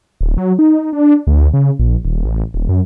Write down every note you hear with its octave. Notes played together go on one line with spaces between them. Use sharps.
D1
F#3
D#4
D4
D2
C#3
A#1
D#1
A1
D#1
F#2